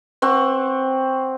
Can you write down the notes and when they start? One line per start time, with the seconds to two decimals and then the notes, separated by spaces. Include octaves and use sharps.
0.22 C4 F#5 C#6